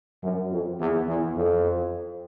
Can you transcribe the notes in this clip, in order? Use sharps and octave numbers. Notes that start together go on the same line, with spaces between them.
F#2
F2
E2
E2
F2